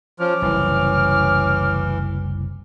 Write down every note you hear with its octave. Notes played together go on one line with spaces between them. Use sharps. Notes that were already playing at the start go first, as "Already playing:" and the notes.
F3 C#4 D6 F6
F#1 C2 E3